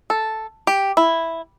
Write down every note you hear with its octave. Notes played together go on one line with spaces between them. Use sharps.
A4
G4
E4